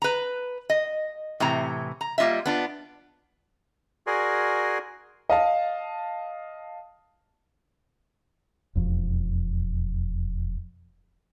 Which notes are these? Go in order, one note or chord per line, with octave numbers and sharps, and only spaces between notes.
B4 A#5
D#5
A2 C3 E3 A#5
A#5
G3 A#3 F4 D#5 E5
B3 D4 F4
F#4 G#4 A#4 D5 G#5 C6
D#5 F5 A5
E1 F2